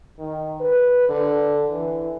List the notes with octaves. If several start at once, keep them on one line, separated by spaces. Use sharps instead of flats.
D#3
B4
D3
E3